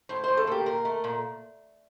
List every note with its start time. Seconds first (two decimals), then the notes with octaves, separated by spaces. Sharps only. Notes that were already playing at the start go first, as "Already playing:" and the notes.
0.09 A2 C5
0.24 A2 C5
0.37 A4
0.47 A#3 G4
0.66 A#2 A#4
0.85 A3
1.04 A#2